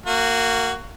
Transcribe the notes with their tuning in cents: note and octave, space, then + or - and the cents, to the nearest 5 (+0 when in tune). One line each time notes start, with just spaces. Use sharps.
A#3 -20 F#4 +10